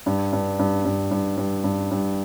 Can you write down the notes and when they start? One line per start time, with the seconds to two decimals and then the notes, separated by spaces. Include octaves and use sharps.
0.06 G2
0.33 G2
0.59 G2
0.85 G2
1.11 G2
1.37 G2
1.64 G2
1.91 G2